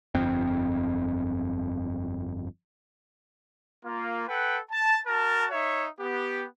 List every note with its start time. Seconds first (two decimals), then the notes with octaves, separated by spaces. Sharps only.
0.15 G1 F2 C4
3.85 A#3 F4
4.28 A4 B4 F#5 G5
4.71 A5
5.07 F#4 A#4 A5
5.51 D#4 C#5 E5
6.00 B3 G4